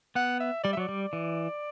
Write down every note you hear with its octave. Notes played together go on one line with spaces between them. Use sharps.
B3 F#5
E5
G3 D5
E5
F#3 D5
G3
E3